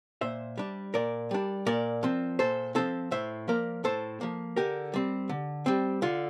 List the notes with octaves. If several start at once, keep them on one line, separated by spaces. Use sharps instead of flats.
A#2 C5 E5
G3 D4
A#2 A#4 D5
G3 D4
A#2 A#4 D5
F3 C4
A#2 A4 C5
F3 C4 A4 C5
A2 C5 E5
F3 A#3 A#4 D5
A2 A4 C5
F3 A#3
D3 G4 A#4
G3 C4
D3
G3 C4
D3 F4